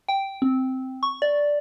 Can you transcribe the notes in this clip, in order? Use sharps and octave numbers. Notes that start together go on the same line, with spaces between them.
G5
C4
C#6
D5